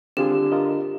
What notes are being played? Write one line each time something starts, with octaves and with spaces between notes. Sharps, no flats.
D3 G3 C4 F4 G4 G#4
F4 A#4 D#5